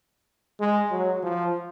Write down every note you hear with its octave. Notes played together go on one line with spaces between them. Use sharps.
G#3
F#3
F3